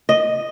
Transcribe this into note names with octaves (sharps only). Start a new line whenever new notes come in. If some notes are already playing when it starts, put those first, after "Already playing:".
D#5